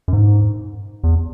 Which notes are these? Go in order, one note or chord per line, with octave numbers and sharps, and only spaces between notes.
F#2
G#2
E2